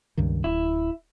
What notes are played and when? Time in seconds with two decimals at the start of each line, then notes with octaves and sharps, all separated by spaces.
0.17 C#2 G2 D#3
0.44 D1 E4